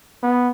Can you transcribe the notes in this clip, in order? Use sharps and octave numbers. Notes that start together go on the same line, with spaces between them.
B3